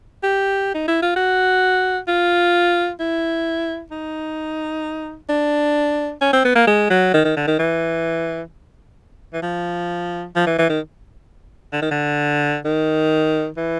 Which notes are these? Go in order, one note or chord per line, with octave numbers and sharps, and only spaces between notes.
G4
D#4
E4
F4
F#4
F4
E4
D#4
D4
C#4
C4
B3
A#3
G#3
F#3
D#3
D#3
D3
D#3
E3
E3
F3
F3
E3
E3
D#3
D3
D#3
D3
D#3
E3